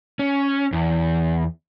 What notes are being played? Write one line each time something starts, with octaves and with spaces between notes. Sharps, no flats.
C#4
E2